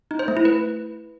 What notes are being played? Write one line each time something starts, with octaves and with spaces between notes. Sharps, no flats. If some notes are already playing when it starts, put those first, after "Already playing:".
D#4
C5
A3
E4
B4